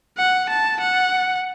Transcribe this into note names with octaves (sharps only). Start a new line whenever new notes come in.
F#5
A5
F#5